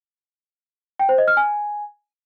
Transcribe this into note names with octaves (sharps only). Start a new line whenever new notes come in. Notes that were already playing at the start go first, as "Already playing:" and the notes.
G5
C5
D#5
F6
G#5